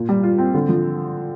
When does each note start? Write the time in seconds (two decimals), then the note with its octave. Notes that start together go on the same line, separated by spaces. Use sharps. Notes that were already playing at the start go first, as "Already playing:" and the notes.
Already playing: A#2
0.09 G3
0.23 F4
0.38 C4
0.54 D3
0.69 F3